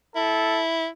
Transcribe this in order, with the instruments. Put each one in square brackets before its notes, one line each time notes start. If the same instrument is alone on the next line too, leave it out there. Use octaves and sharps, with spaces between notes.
[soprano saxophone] E4 [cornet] A4